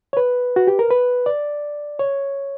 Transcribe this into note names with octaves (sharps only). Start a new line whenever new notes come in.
C#5
B4
F#4
G4
A#4
B4
D5
C#5